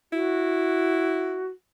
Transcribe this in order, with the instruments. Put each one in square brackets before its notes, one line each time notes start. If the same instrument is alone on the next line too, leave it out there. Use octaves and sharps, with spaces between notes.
[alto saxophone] E4 [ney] F#4